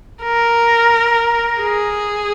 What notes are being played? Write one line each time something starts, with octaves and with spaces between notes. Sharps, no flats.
A#4
G#4